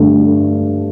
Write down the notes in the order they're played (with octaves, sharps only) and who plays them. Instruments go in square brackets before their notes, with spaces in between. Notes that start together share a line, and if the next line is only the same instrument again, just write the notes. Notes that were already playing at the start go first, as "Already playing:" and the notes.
Already playing: [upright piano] G2 D3 A3